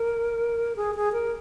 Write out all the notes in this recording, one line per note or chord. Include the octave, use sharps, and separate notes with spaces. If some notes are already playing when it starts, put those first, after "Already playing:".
Already playing: A#4
G#4
G#4
A#4